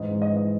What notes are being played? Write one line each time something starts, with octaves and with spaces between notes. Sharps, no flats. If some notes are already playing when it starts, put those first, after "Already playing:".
Already playing: G#2 E3 D#5
G#2
D#5
E3
D#5